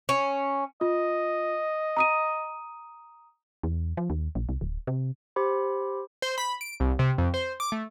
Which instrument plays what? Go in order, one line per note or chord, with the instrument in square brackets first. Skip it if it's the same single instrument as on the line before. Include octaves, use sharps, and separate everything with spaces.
[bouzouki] C#4
[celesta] F4 [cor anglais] D#5
[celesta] A#5 D#6 D#7
[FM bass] E2
F3
D#2
A#1
C2
D1
C3
[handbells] G4 C5 B5
[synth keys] C5
B5
D7
C2
C3
F2
C5
D6
A3